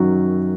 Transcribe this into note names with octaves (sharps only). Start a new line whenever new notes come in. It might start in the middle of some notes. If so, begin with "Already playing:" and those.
Already playing: F#2 D#3 F#3 F#4